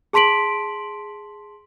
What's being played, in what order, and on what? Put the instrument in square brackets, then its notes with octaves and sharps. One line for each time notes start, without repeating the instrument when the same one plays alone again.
[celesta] G#4 A5 C6 B6 D7 F#7